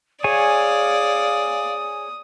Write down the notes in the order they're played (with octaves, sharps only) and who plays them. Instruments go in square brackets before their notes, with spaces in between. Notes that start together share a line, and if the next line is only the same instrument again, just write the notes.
[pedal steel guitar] G#4 C#5 G#5 [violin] D5 [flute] F5 [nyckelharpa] D#6